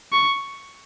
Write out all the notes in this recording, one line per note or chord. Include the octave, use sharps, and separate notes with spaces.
C#6